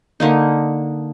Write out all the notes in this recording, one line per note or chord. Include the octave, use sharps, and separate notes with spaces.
D3 A#3 D#4